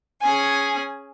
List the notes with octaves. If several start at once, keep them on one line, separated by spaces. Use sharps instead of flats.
C#4 G#4 G#5